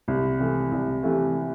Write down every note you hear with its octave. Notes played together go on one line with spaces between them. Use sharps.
C2
C3 E3 A3
C2
C3 E3 A3